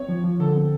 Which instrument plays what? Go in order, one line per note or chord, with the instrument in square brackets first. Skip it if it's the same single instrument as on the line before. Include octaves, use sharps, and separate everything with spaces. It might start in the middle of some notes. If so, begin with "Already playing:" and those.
Already playing: [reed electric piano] C4 [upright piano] C#5
[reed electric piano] F3
F3
[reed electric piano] D3 [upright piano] A4
[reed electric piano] C4